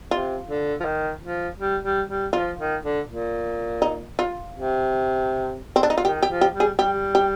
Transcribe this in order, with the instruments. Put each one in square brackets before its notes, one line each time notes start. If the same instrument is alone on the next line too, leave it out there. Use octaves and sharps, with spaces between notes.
[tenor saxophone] C3 [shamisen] F4
[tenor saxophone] D3
F3
D#3
F3
G3
G3
G3
[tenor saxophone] F3 [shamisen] F4
[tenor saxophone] D#3
D3
A#2
[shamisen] D#4
F4
[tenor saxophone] C3
[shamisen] C4
D4
D#4
F4
[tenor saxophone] D#3 [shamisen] G4
[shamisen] G4
[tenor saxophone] F3
[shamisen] G4
[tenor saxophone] G3
[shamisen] G#4
[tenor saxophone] G3 [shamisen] G4
[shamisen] G4